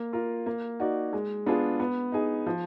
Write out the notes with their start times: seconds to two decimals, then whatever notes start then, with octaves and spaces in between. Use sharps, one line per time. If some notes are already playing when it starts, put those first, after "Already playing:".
Already playing: A#3
0.13 F4 A#4
0.46 A#3
0.80 D#4 F#4 D5
1.13 G#3
1.46 B3 D4 F4 G#4
1.80 B3
2.12 D#4 G#4
2.46 F3